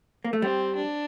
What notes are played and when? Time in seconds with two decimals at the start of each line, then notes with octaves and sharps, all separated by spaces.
0.24 A#3
0.33 A3
0.42 G3 C4
0.76 D4